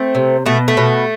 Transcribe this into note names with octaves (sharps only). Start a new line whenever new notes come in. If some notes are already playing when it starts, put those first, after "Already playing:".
Already playing: A3 C4
C3
B2 A3
A3
B2